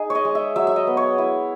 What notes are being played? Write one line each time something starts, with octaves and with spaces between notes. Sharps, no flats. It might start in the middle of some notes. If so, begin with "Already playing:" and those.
Already playing: D#4 G#4
C#5 D#5
G#3
E5
F#3 E5
E5
D#5
B3
C#5
E4